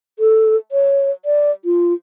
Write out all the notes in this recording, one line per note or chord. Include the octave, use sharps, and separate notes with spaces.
A4
C#5
D5
F4